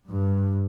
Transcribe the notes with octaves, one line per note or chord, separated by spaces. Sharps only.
G2